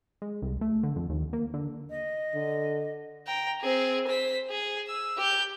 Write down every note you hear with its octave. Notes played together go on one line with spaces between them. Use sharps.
G#3
C2
A3
D3
F2
D#2
A#3
D3
D#5
D3
G5 A#5
C4 G#4
C5 B6
G#4
E6
G4 G6